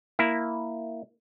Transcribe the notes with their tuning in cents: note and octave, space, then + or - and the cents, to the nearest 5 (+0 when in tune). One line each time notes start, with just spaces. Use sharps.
A#3 +0 E4 +0